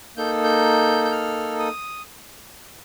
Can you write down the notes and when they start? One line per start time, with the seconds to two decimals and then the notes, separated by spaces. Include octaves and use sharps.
0.17 A#3 D#4 A4 G6
0.44 G6
1.05 G6
1.11 F6
1.59 D#6